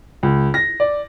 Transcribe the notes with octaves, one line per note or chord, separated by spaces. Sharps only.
C#2
A#6
D5